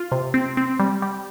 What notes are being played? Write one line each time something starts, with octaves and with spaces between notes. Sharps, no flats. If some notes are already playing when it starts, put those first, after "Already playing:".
Already playing: F4
C3
C4
C4
G3
G3